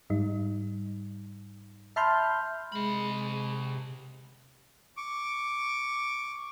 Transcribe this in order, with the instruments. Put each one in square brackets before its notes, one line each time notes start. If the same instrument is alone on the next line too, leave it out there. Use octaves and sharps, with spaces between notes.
[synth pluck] G#2 G3 D#4
E5 A5 B5 C6 F6 G6
[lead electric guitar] C3 B5 [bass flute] G#3
[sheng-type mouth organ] C#6 D6